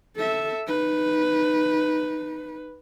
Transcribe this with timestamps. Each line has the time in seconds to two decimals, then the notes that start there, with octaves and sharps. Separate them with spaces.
0.16 A4 E5
0.67 D#4 B4